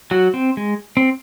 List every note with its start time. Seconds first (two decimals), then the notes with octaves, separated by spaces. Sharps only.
0.11 F#3 F#4
0.34 C4
0.57 G#3
0.97 C4